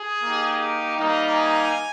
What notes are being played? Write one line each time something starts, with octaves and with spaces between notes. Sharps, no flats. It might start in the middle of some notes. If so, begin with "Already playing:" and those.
Already playing: G#4
A#3 D#4 G4
G3 A#3 D#4
G#5